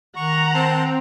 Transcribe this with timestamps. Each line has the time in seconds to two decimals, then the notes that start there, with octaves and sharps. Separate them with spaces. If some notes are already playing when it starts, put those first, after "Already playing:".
0.16 D#3 F#5 A#5 C#6
0.54 C4 A5 C6